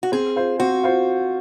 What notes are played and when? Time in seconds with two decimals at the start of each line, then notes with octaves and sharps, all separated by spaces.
0.03 F#4
0.12 C4 G#4
0.36 F4 C5
0.59 C4 F#4
0.84 F4 C5